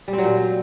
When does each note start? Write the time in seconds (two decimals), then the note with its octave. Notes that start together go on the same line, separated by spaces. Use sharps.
0.08 G3
0.13 C4
0.18 F#3
0.24 A#2